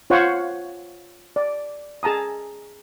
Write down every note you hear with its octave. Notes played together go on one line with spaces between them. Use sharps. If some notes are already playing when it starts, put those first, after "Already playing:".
F4 C5 C#5 F#5
D5
G#4 A5 A#5 D#6